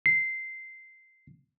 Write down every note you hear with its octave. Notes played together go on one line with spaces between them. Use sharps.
C7